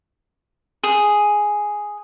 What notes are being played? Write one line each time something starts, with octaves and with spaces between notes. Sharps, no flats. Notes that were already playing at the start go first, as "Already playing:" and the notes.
G#4